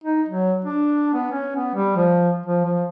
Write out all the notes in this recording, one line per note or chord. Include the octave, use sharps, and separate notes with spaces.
D#4
F#3
D4
B3
C#4
B3
G3
F3
F3
F3